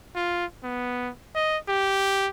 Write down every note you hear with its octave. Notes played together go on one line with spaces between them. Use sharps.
F4
B3
D#5
G4